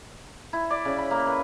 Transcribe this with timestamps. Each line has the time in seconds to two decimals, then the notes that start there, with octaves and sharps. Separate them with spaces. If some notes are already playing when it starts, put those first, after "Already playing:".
0.53 E4
0.70 D5
0.85 C#3
0.98 B5
1.11 A#3
1.27 B4